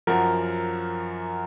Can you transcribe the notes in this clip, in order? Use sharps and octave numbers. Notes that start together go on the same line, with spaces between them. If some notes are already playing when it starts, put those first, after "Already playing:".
F#2 F3 F#4 A#4